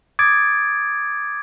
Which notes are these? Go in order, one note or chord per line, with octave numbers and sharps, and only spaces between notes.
D6 D#6 G#6 A6 D7